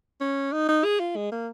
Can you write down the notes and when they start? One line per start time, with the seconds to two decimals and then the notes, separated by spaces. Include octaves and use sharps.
0.21 C#4
0.53 D#4
0.69 D#4
0.85 G#4
1.00 F4
1.16 G#3
1.32 A#3